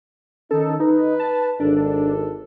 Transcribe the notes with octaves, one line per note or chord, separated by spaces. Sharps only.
D#3 C#4 D#4 A4
D#4 B4
A5
G#1 D4 A4